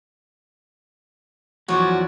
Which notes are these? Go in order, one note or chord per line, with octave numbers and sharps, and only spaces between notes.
E2 F3 F#3 F#4 C#5 D5